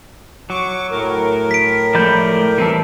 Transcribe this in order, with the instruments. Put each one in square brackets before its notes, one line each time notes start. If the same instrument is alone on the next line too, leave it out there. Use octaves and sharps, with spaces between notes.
[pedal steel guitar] F#3 [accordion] C#6 D6
[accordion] A2 A#4
[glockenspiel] B6 D7
[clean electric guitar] F3 G#3 A3 [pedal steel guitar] D5 B5 G6
[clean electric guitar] E3 [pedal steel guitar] G3 C4 A4